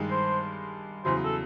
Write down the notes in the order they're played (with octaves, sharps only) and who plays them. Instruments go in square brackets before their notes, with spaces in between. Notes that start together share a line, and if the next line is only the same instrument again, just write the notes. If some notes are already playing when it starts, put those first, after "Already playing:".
Already playing: [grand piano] G2 D#3 G#3
[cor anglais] C5
[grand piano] E2 C#3 F#3 [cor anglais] C5
[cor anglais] A4